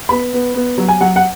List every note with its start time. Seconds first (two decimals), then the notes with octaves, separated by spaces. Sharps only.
0.09 B3 B5
0.33 B3
0.54 B3
0.78 F#3
0.88 G#5
1.01 F#3 F#5
1.16 F#5